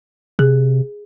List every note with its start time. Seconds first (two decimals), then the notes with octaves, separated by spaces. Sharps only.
0.39 C3 G#4